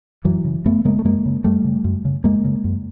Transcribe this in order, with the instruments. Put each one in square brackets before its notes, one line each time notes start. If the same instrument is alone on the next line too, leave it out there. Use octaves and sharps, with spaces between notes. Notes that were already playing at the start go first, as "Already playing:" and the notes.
[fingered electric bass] F#2 E3 F#3
C#3
F#2 A3 B3
C#3 G#3 A#3
A3
F#2 G#3 A#3
C#3
F#2 G3 A3
C#3
F#2
C#3
F#2 G#3 A#3
C#3
F#2